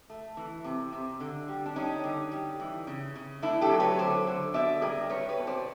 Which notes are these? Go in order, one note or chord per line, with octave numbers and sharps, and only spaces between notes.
A3
E3
C3
C3
D3
G3
D4
G3 C#4 D#4
D3
G3
E3
C#3
C#3
A3 D4 E4
G4 A4
F#3
B4 C#5
D3 C5 D5
D3
B2 D5 E5
G3 G#4 A#4
G3 B4 C#5
B4 C#5
B2
C5 D5